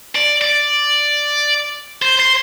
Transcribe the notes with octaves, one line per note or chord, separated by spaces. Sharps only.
D5
D5
C5
C5